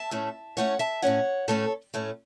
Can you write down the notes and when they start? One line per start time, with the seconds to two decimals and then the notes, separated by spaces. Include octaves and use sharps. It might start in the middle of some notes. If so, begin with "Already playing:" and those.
Already playing: E5 A5
0.11 A2 A3 C#4
0.57 A2 A3 C#4 C#5 F#5
0.79 E5 A5
1.02 A2 A3 C#4 C#5 F#5
1.48 A2 A3 C#4 A4 C#5
1.94 A2 A3 C#4